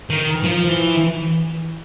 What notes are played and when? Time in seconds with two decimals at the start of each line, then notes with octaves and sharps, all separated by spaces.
0.10 D#3
0.44 F3
0.69 E3